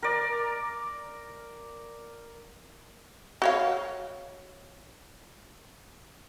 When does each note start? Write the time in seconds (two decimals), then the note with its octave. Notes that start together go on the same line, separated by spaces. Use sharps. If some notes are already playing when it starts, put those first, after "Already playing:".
0.02 A#4 D5
3.42 F#4 C#5 F5